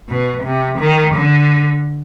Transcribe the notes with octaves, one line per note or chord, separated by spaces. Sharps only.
B2
C3
D#3
D3